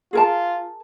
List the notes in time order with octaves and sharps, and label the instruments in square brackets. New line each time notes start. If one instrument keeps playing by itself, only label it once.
[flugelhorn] F4 [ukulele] G#4 A#4 A5